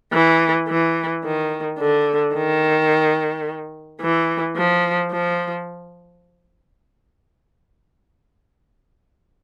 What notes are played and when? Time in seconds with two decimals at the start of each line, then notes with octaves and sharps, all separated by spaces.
0.12 E3
0.68 E3
1.24 D#3
1.79 D3
2.34 D#3
4.01 E3
4.56 F3
5.12 F3